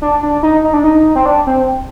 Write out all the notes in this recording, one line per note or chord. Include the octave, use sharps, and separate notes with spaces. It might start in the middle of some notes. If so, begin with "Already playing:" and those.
D4
D4
D#4
D#4
D4
D#4
C4
D4
C4